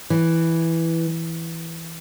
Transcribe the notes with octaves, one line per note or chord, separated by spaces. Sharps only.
E3